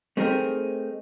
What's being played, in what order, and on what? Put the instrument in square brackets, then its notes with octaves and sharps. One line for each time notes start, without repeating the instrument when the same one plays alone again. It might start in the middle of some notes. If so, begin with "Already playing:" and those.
[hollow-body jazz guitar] A3 C4 D#4 G4 G#4 A#4